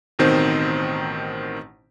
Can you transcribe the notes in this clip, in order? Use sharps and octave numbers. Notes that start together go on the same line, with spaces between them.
A1 B2 D#3 C4 D#4 C5